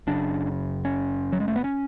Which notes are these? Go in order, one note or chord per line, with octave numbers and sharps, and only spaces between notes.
F#1 F#2 C#3 D4
C#4
F#3
G#3
A3
B3
C#4